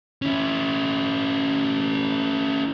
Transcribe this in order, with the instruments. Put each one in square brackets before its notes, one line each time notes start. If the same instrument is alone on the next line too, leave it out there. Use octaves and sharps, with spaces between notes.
[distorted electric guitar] C#4 E4